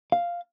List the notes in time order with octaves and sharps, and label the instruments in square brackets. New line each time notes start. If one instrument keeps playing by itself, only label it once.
[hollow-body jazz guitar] F5